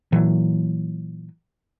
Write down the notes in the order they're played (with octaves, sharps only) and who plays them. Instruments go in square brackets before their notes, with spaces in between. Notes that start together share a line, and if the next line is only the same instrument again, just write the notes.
[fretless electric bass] A#2 E3 F#3